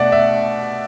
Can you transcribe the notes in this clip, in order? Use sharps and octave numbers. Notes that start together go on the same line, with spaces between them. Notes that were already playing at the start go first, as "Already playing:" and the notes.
Already playing: B2 A3 D5 E5 F#5
E5